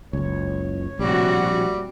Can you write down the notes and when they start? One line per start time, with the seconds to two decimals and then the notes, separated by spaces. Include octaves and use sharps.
0.13 F#1 C#2 C#5
0.99 A#1 A2 C3 G3 F#4